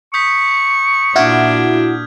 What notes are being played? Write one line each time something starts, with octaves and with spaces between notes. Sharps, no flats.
C#6 D#6 G6 B6
A#2 D4 E4 F#4 F6 G6 G#6